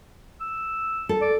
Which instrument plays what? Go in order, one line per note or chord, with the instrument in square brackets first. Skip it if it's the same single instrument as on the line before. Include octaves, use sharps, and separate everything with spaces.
[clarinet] E6
[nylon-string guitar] A4
[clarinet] D5